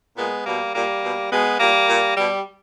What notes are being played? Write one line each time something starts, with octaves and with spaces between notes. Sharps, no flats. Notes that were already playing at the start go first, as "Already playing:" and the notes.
A#2 G#3 B3
B2 G3 A#3
A#2 G3 A#3
B2
B2 G#3 B3
A#2 G3 A#3
A#2
B2 G3